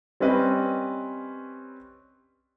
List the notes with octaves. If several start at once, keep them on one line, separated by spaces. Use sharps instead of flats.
G3 C4 C#4 B4 D#5